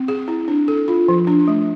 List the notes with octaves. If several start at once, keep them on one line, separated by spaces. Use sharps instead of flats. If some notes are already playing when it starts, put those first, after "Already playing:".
Already playing: C4
G#4
E4
D4
A4
F4
F3
D4
A3